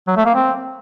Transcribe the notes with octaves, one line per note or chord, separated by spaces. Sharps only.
F#3
A3
A#3
C4